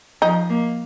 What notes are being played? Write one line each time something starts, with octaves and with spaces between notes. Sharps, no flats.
F3 D#4
A#3